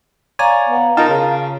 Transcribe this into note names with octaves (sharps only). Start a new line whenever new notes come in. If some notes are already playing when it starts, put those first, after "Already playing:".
C#5 D5 F5 G#5 A#5
B3
D#4 F4 A#4 A5
C#3